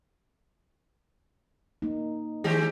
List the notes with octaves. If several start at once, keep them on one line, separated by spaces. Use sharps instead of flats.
A#3 D#4
D#3 G#3 G4 G#4